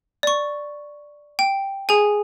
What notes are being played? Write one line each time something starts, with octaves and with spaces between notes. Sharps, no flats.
D5 C#6
G5
G#4 G#5